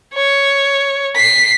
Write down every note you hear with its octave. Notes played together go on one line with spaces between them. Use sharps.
C#5
B6 C7